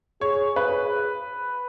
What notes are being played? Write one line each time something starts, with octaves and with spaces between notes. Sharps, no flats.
G#4 C#5
B4